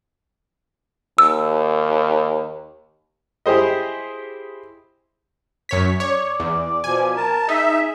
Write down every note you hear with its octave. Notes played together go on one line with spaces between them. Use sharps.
D#2 E6
E4 G4 G#4 C5 D#5
F#2 C#5 B6
C#5 D5
E2
B2 F3 G#5
A#4 A5
D#4 G#4 E5